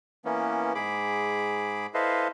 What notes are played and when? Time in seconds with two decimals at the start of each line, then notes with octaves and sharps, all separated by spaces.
0.25 E3 A#3 B3 C#4
0.75 G#2 G#4 B5 D6
1.94 E4 A4 B4 C5 D#5 F5